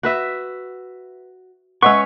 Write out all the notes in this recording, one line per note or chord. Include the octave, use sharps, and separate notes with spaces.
F#4 B4 E5
G#3 C#4 B4 D#5 F#5 C#6